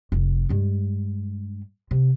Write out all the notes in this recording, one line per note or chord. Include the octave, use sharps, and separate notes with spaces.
F1
G2 G#3
C3